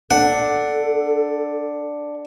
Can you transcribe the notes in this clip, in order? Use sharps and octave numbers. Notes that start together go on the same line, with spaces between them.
D4 A4 F#5